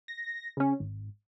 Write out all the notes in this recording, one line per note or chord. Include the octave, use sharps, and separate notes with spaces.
A#6
C#3 C#4
G#1